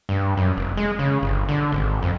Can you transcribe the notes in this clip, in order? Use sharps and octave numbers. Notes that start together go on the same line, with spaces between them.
G2
F#2
F1
G#3
C#3
G1
D3
G#1
F2